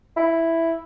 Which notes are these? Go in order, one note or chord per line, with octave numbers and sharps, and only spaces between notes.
E4